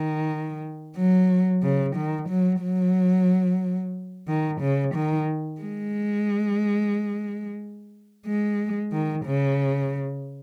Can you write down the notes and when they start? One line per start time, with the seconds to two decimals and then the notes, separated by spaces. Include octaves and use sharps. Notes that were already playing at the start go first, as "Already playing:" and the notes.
Already playing: D#3
0.96 F#3
1.63 C#3
1.96 D#3
2.29 F#3
2.62 F#3
4.28 D#3
4.61 C#3
4.95 D#3
5.61 G#3
8.26 G#3
8.92 D#3
9.25 C#3